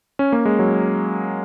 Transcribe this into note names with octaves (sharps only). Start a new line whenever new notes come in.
C#4
A#3
G#3
F#3